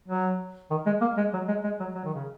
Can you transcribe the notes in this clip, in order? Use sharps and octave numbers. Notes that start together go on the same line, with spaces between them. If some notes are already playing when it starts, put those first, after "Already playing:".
F#3
D#3
G#3
A#3
G#3
F#3
G#3
G#3
F#3
F#3
D#3
C#3